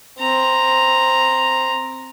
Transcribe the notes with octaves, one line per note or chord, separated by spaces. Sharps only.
C4 A#5